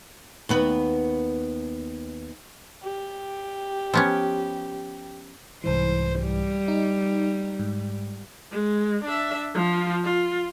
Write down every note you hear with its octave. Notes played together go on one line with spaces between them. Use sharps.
D#2 B3 B4
G4
F3 B3 C#4
C2 G#2 E3 C5
G3
D#4
G#2
G#3
D4 E5
F3 F4
F4